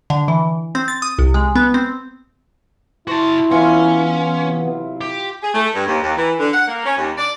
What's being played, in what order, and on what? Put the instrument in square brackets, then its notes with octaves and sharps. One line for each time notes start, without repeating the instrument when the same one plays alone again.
[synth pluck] D3
E3
C4
A6
D#6
C2
G#3
B3
C4
[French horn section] E4 [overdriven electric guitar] F#4 A5 [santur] C5
[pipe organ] E3 B3 [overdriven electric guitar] C#4 [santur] F4 E5
[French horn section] C3 F#3 E4
[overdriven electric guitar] G4
[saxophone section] G#4
A3
G2
D#2
D#2
E3
D3
F#5
A#3
C#4
D#2
D5